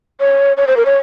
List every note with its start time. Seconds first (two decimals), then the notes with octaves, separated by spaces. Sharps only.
0.20 C#5
0.57 C#5
0.67 C5
0.77 A#4
0.85 C#5